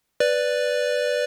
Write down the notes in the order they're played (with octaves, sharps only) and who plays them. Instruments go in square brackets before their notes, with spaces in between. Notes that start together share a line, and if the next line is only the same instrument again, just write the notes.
[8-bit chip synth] B4 D5